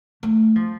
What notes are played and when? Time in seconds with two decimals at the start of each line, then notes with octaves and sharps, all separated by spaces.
0.23 A3
0.56 F3